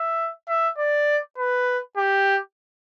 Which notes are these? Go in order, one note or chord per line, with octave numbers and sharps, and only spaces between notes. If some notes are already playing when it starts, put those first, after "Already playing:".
Already playing: E5
E5
D5
B4
G4